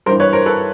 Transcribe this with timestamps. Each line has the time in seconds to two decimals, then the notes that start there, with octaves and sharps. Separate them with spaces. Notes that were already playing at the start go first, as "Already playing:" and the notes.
0.06 G2 A#4 C5
0.10 E3
0.20 B4 C#5
0.33 A#4 C5
0.46 A4 B4